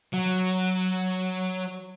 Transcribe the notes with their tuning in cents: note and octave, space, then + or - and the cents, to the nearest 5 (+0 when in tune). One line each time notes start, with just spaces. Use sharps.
F#3 +0